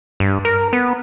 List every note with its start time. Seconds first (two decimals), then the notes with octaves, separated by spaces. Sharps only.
0.20 G2
0.45 A#4
0.73 B3